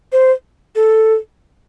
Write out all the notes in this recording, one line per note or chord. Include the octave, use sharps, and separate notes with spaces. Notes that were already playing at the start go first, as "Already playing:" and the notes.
C5
A4